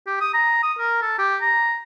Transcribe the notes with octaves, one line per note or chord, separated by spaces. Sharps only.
G4
D#6
A#5
D#6
A#4
A4
G4
A#5